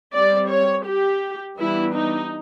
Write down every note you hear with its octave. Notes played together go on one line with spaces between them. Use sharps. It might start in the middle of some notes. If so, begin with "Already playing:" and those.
G3 C4 D5
C#5
G4
E3 G3 B3 D4 E4
D#4